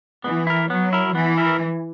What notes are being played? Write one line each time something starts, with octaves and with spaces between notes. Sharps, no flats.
E3 B3
E4 A#4
F#3 B3
E4 A#4
E3 B3
E4 A#4